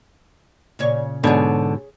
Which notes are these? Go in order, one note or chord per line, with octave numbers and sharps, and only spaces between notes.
A#2 C#3 C#5
G#2 B2 D3 G#4 C#5